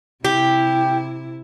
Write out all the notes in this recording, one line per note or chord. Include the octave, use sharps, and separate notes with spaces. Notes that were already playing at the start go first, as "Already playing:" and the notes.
C3 E4 G4